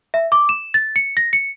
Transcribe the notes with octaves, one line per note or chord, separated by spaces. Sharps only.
E5
D6
E7
A6
C#7
A#6
C#7